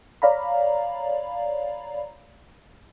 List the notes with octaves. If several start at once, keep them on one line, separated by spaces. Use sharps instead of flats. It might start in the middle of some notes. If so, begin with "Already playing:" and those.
C#5 D5 F5 A#5 B5